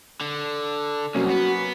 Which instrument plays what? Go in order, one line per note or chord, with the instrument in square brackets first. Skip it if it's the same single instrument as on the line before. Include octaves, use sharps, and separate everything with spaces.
[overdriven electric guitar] D3
[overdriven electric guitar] C2 [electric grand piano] F#3 A#3 C#4 [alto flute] F#4
[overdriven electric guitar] B3